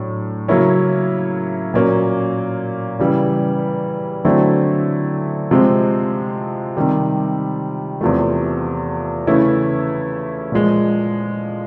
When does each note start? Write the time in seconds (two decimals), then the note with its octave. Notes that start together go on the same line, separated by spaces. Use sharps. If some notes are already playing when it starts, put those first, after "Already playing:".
Already playing: A2 F#3 D4
0.48 C#3 F#3 A#3 C#4 E4
1.74 A#2 F#3 A#3 C#4
2.99 C#3 E3 G3
4.25 D3 F#3 A3 C4 E4
5.51 C3 F3 G#3 C4
6.77 C3 D#3 G3
8.01 E2 C3 F3 A3
9.27 C#3 E3 A3 C#4 E4
10.52 A#2 F3 G#3